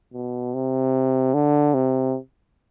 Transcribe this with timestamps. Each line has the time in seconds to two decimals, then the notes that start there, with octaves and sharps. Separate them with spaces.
0.14 B2
0.54 C3
1.34 D3
1.74 C3